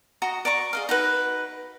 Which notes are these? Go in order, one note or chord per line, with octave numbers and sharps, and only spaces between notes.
F#4 D#5 A#5
D5 A#5 C#6
G#4 D#5 F5
D#4 F#4 B4